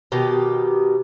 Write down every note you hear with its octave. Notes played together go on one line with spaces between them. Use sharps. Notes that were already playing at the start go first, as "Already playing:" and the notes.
B2 D#3 G4